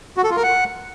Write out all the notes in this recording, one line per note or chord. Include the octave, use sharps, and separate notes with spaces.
F#4
A4
F4
A#4
F#5